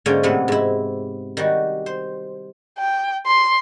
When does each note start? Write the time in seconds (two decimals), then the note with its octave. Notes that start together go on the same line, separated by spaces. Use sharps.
0.06 G#2 D3 A#3 C#4 G#4 G5
0.23 A2 C3 E3 F#3 A3 B3
0.48 G#2 E4
1.37 D#3 G3 F#4
1.86 C5
2.79 G5
3.27 C6